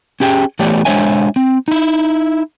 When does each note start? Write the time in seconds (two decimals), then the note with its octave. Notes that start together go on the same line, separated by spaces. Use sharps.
0.20 C#4 G4 G#4 G5
0.59 E3 A3 B3 G4 C#5 D5
0.85 G#3 D4 C5 C#5 E5 G#5
1.36 C4
1.68 D#4 E4